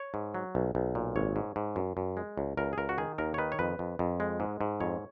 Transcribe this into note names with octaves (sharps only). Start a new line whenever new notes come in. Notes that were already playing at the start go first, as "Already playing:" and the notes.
Already playing: C#5
G#2
F#3
B1
B1
A#2
G#1 C#5
G#2
G#2
F#2
F#2
G#3
C#2
C#2 A#4
G#4
C#2 A#4
F#4
D#3 G#4
D#2 A#4
C#5
D#3 B4
C#5
F2 B4
F2
F2
G#3
G#2
G#2
F2 C#5